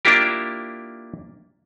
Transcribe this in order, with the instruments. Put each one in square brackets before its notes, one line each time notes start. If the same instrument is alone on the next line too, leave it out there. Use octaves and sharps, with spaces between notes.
[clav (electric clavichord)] A#3 D4 E4 F4 G4 A#4